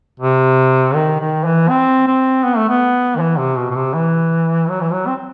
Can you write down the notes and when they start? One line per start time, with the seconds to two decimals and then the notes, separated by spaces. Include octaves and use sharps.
0.20 C3
0.95 D#3
1.20 D#3
1.45 E3
1.69 C4
2.07 C4
2.44 B3
2.57 A3
2.69 B3
3.15 D#3
3.20 E3
3.38 C3
3.57 B2
3.70 B2
3.75 C3
3.94 E3
4.69 F#3
4.81 E3
4.92 F#3
5.07 C4